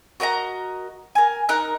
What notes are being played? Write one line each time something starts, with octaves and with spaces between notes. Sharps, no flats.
F#4 A#4 D#5 A#5
A#4 G#5
D#4 A#4 F#6